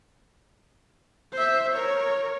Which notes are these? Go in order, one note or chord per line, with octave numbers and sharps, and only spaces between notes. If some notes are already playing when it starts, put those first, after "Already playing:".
C5 E5
A#4 C#5